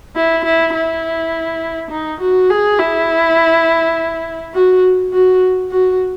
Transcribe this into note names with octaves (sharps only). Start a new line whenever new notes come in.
E4
E4
E4
D#4
F#4
G#4
E4
F#4
F#4
F#4